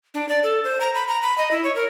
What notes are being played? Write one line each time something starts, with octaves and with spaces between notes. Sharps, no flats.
D4
D5
A4
C5
A#5
B5
A#5
B5
D#5
E4
C#5
A#4